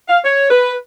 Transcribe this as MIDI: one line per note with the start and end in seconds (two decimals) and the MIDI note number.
0.09 0.18 77
0.24 0.47 73
0.51 0.73 71